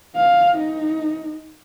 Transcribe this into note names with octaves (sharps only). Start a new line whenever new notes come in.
F5
D#4